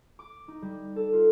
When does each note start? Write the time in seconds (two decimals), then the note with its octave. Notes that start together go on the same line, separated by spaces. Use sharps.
0.19 D6
0.48 D#4
0.62 G3
0.96 A4
1.13 F4